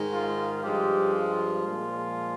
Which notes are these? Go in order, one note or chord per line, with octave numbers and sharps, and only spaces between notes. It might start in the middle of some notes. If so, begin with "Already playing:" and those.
Already playing: G#2 D#3 G#3
F4
G2 F3 G#3 G4
F4
A#2 F3 G#3